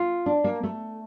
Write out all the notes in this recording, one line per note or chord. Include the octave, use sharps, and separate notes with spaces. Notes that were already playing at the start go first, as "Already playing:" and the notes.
Already playing: F4
D4
A#3
A3